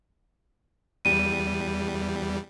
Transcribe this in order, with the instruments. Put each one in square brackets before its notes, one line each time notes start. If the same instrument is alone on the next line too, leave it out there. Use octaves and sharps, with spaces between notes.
[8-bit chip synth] E2 G3 [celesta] D#7